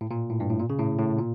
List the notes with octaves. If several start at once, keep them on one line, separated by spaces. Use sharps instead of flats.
A2
A#2
A2
G2
A2
A#2
C#3
A2
A2
A#2